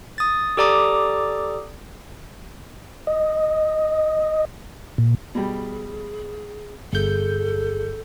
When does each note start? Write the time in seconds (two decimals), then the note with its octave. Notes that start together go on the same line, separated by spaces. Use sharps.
0.18 D#6 A6
0.57 G4 A4 D5 A#5 D6 D#6
3.07 D#5
4.98 A#2
5.35 B2 G3 G#4
6.93 G1 G#4 A4 G6